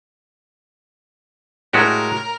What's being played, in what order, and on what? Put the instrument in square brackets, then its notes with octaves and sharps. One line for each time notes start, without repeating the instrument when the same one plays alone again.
[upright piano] A2 [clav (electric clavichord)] G#3 F#4 G4 [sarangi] A#4